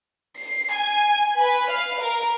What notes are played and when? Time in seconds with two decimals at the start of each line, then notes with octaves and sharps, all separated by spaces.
0.38 C7
0.73 G#5
1.40 B4
1.71 F5
2.01 A#4